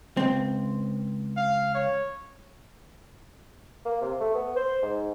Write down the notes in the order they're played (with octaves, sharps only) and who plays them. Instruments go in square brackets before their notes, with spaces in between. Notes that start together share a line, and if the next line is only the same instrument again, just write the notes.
[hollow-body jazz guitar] C#2 C4
[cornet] F5
C#5
[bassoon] A#3
C3
A3
B3
C5
G#2